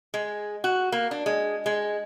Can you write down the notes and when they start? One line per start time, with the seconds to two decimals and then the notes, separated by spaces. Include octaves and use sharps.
0.14 G#3
0.64 F#4
0.92 A#3
1.11 D4
1.26 G#3
1.66 G#3